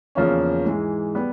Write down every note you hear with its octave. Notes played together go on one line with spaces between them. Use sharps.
E2 C#3 F3 A#3 C#4
G#2 E3 G#3
G3 B3